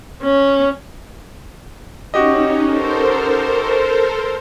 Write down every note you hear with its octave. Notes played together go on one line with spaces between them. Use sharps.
C#4
C#4 D#4 F#4 G4 D#5
A4 A#4 C5